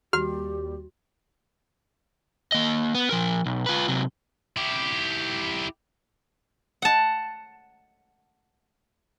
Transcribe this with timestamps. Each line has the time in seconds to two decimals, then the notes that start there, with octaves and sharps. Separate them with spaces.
0.13 D#2 G3 F#4 G4 F6
2.52 A#3 D#5
2.95 B3
3.11 F3 A#4
3.46 B1
3.66 F4 B4
3.88 C3 F#3
4.57 E4 G4
6.82 F#5 A5